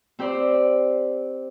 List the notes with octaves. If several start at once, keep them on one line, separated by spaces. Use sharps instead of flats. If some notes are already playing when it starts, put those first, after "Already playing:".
C4 G4 C5 D5